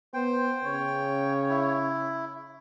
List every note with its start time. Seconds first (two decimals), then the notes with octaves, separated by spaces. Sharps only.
0.14 B3 C5 G5
0.64 C#3 C#5
1.50 E4